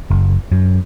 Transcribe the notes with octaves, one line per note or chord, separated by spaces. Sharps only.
F#1
F#2